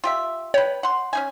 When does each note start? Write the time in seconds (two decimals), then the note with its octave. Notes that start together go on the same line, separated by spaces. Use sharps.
0.04 F4 G4 E5
0.54 B4 C#5 G5
0.83 F#5 C6
1.13 C#4 D#4 G#5